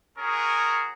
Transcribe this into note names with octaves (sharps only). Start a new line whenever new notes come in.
C#4 F#4 G#4 A#4